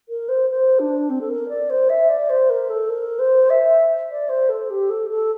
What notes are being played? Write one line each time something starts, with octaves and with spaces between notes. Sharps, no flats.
A#4
C5
C5
D4
C4
A4
A#4
D5
C5
E5
D5
C5
A#4
A4
A#4
C5
E5
D5
C5
A4
G4
A4
A4